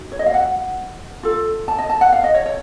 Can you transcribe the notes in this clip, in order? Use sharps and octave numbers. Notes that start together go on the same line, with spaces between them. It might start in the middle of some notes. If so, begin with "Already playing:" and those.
Already playing: D#4 F#4
C#5
D#5
F5
F#5
F4 A4
A5
D#5
A5
F#5
F5
D#5
C#5
C#5